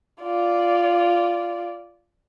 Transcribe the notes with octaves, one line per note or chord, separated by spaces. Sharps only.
F4 D5